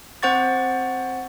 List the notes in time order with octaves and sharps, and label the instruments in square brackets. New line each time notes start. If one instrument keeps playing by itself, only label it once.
[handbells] C4 C5 F#5 C#6 A6